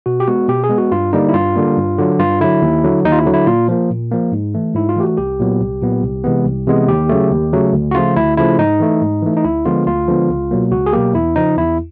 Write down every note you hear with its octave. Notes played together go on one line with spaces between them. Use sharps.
B2 F#4
G4
G#3 B3 F#4
B2 G4
G#4
G#3 B3
F#4
G2 F4
D3 G3 A#3 D#4
E4
G2 F4
D3 G3 A#3
G2
D3 F#3
G2 F4
D3 F#3 E4
D#2
D3 F#3
D#2 D#4
F4
E4
D3 F#3
E4
A#2 F4
F3 A#3
A#2
F3 A#3
G#2
E3 A3
G#2 E4
F4
E3 A3 G4
F#4
C2 G4
A#2 F#3 B3
C2
A#2 F#3 B3
C2
C3 E3 G#3 B3
C2
C3 E3 G#3 B3
D#2 G4
C#3 F#3 A3
D#2
C#3 F#3 A3
D2
F#4
C#3 F3 A3 F4
D2 E4
C#3 F3 A3 E4
G#2 D#4
E3 A3
G#2
E3 A3
D#4
D2 E4
D3 F3 G#3 B3 F4
D2 F4
D3 F3 G#3 B3
C#2
B2 F#3 A#3
C#2 F#4
G#4
B2 F#3 A#3 G4
E2 E4
C#3 F3 D#4
E2 E4